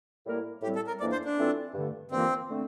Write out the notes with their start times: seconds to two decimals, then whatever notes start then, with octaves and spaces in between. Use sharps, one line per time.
0.25 A2 G3 A#3 E4 A#4
0.62 A2 G3 C4 G4
0.76 A4
0.87 A#4
1.00 F2 E3 A#3 D4 D5
1.12 C5
1.25 D4
1.37 E3 A3 C4 F4 A4
1.74 G2 D3 A3
2.11 G2 E3 A#3 C4 F4 A#4
2.48 D3 A3 C4